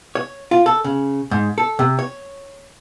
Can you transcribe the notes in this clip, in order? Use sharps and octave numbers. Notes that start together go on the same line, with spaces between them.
C#5
F4
A4
C#3
G#2
A4
C3
C#5